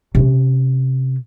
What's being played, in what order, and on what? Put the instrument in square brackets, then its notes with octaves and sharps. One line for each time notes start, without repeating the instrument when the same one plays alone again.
[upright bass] C3 C#4